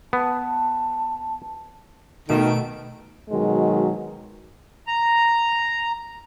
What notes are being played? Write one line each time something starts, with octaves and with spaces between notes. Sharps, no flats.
B3 A5
B2 D#3 A3 D7
B2 D#3 F#3 G#3
A#5